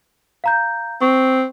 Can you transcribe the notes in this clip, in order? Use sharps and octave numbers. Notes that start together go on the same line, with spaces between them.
F5 A#5 G6
C4 C#6